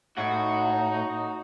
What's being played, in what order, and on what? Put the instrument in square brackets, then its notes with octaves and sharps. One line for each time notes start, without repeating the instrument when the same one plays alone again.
[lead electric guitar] A2 [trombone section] D#4 [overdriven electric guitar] F#4